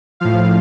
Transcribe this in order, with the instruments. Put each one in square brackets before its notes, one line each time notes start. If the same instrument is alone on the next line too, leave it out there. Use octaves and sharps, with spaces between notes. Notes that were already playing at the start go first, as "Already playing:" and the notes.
[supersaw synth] A2 F3 F5